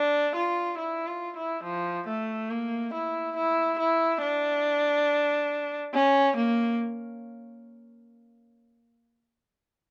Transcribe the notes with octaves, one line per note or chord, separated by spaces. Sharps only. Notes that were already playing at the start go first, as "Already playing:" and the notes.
Already playing: D4
F4
E4
F4
E4
F3
A3
A#3
E4
E4
E4
D4
C#4
A#3